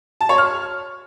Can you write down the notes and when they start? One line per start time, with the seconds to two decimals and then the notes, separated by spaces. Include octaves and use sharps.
0.21 A5
0.29 C#5
0.38 F6